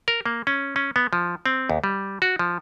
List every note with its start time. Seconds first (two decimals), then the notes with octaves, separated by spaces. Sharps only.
0.08 A#4
0.26 A#3
0.47 C#4
0.76 C#4
0.96 B3
1.13 F3
1.46 C4
1.70 D#2
1.84 G3
2.22 F#4
2.39 F3